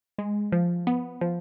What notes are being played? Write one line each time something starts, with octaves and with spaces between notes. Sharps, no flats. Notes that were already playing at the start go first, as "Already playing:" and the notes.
G#3
F3
B3
F3